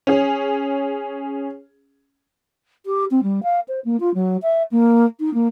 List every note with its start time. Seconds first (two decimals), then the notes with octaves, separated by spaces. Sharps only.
0.07 C#4 G#4
2.86 G4
3.11 C4
3.23 G3
3.43 F5
3.68 C5
3.85 A#3
4.00 F4
4.14 F#3
4.42 E5
4.71 A#3
5.20 D#4
5.34 A#3